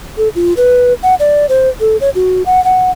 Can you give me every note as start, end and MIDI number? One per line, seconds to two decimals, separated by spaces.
0.17 0.28 69
0.35 0.53 65
0.57 0.93 71
1.03 1.15 78
1.20 1.46 74
1.49 1.69 72
1.80 1.97 69
2.01 2.10 73
2.15 2.42 66
2.46 2.63 78
2.64 2.91 78